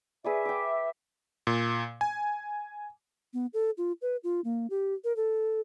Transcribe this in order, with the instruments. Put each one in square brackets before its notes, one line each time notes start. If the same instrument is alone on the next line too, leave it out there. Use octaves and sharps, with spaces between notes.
[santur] G#4 B4 D5 [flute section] E5
[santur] G5 D6
[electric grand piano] A#2
G#5
[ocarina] B3
A4
F4
B4
F4
A#3
G4
A#4
A4